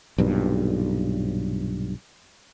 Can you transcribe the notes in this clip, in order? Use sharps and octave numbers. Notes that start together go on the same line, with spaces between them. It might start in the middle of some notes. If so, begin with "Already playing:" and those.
B1 G2 A#2